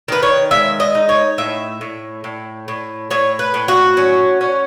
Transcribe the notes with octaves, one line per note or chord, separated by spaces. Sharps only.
D#3 B4
C#5
G#3 E5
D#5
D#4
C#5
A2 E5
A2
A2
A2
A2 C#5
B4
A2
F#4
C#4
C#4